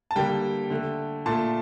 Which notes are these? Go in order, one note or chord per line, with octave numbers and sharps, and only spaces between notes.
A5
D3 G3 A#3 G5
D3 A3
A#2 A3 A5